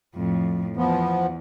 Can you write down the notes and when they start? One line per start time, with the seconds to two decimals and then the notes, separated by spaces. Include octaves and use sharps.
0.16 F2 A2
0.77 E2 F3 B3